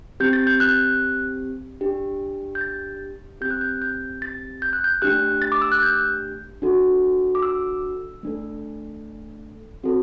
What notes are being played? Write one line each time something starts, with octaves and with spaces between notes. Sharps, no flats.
C4 G4 G6
A6
G6
F#6
D4 G4
G6
A6
C4 G4 G6
F#6
G6
G6
A6
G6
F#6
G6
A3 D4 G4 F#6
A6
D6
E6
F#6
G6
D4 F#4 A4
D6
E6
A3 D4 A4
C4 F#4 A4